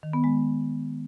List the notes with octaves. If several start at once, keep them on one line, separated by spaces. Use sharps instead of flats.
D#3
B3
G#3